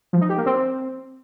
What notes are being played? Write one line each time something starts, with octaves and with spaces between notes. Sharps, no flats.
F3
D#4
G4
A#3
C4